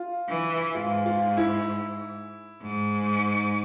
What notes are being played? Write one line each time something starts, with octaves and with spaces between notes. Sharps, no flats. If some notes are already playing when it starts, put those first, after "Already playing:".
Already playing: F4
E3
G#2 F4
F4
E4
G#2